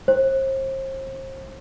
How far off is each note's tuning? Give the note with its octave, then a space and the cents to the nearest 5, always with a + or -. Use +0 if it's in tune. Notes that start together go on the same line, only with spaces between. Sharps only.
C5 +35